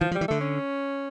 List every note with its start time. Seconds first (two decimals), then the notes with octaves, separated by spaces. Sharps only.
0.01 E3 F3
0.11 F3
0.15 G3
0.21 E3
0.28 D3 A3
0.41 C#4